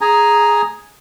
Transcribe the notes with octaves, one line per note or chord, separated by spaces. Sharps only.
G#4 G#5 A#5